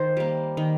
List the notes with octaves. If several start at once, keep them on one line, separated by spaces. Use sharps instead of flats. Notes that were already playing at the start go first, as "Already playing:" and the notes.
Already playing: D#3 C5
G3 A#3
D#3